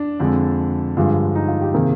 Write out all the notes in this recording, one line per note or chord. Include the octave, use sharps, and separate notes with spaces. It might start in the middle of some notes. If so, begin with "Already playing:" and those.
Already playing: D4
F2 D3 G#3
G2 D3 F3 G#3
D#4
F4
G4
C3 D#3 A#3 G#4